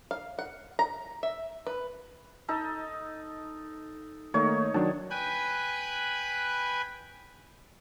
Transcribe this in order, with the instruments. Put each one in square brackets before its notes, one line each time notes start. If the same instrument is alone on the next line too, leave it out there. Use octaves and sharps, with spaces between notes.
[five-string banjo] F5
F#5
A#5
E5
B4
[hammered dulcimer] D#4 A4
[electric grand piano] D#3 A3 A#3 [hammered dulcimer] D#4 C#5
[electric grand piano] D#3 F#3 D4 [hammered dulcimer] A5
[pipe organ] B4 G5 G#5 B5 F#6 G#6